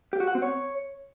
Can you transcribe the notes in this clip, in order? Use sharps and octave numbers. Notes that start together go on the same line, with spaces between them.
G4
F#4
F#5
C4
C#5